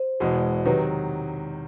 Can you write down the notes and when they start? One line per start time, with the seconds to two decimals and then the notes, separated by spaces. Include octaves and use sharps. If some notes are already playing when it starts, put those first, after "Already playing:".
Already playing: C5
0.20 E1 E2 B2 G#3
0.65 C3 D#3 F#3 B4